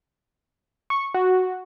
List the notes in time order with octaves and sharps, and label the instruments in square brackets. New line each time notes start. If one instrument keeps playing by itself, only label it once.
[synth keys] C#6
F#4